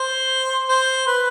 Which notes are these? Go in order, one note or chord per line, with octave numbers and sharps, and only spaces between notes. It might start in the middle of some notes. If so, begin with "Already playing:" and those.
Already playing: C5
C5
B4